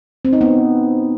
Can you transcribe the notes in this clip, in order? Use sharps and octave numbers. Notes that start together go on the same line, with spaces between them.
C4
D#4
B3